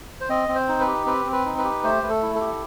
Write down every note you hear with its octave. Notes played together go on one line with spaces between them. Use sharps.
C5
C4 D#5
C4
C5
D#4
B4
G4
C4 B4
C4
B4
D#4
B4
G4
A3 C5
A3 B4
A4
E4
A4
G4